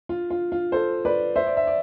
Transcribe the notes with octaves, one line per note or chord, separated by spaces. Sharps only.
F4
F4
F4
A4 C5
B4 D5
C5 E5
D5
E5
D5